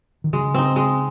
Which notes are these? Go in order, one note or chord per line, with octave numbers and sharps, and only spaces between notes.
D#3
C#3 G#3
C4 D#4
G#3